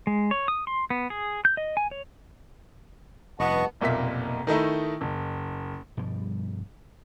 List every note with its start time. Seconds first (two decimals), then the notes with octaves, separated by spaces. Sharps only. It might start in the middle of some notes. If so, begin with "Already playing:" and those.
0.07 G#3
0.31 C#5
0.48 D#6
0.67 C6
0.90 B3
1.10 G#4
1.45 G6
1.57 D#5
1.77 G#5
1.91 C#5
3.40 F1 G2 B3 D#5 F#5 A5 C#6
3.81 F1 B1 A#2 A#3 E5 B6
4.47 D#3 A3 D#4 E4
5.01 F#1
5.97 G2 B2 F3 G3